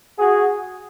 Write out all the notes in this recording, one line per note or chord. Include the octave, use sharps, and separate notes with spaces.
F#4 G#4